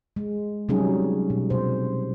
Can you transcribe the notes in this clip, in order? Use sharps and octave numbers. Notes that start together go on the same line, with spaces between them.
G#3
C3 F#3 G3 C#4 D#4 G#4
B2
C3 C5